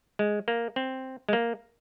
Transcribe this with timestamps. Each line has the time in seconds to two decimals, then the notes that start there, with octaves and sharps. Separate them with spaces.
0.19 G#3
0.48 A#3
0.76 C4
1.29 G#3
1.33 A#3